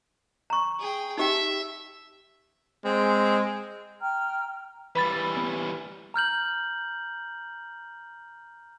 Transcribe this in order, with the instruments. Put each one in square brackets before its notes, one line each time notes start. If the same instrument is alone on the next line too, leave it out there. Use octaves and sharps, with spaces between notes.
[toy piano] A#5 C#6
[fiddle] G#4 G5
[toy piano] D#4 G4 G5 [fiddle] E5
[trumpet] G#3 [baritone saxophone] C4
[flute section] G5 A#5 F6
[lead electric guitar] E3 G3 [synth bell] B4 B5 A6
[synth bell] B3
[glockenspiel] A#5 F6 G6 F#7